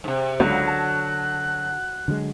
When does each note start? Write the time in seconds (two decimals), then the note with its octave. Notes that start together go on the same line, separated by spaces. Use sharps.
0.04 G#2 C3
0.40 C#2 D3 F#3 F#6
0.67 A5
2.08 D3 F#3 G#3